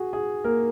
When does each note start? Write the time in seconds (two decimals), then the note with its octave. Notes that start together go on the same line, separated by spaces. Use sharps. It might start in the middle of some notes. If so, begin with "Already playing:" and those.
Already playing: F#4 G#4
0.13 G#4
0.44 A#3 A#4